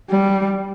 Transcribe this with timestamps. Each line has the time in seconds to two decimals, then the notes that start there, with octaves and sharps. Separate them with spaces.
0.10 G3